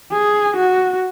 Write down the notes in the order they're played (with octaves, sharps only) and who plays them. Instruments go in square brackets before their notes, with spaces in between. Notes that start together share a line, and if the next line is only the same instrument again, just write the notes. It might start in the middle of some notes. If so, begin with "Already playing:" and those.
[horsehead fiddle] G#4
F#4